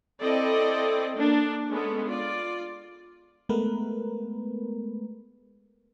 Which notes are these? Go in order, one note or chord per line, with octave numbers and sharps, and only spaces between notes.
C4 E4 A4 D5 D#5
A#3 D4
G#3 B3 C#4 A4
F4 D5
G#3 A3 B3 A#4 B4